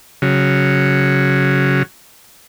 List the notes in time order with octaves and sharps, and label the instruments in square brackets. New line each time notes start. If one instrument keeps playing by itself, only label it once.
[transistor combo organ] C#3 F#3